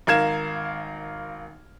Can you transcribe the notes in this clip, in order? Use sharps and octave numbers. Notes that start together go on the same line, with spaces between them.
G#1 A#4 F5 G#6 E7